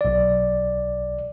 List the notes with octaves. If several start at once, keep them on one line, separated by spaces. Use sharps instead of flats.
B1 D5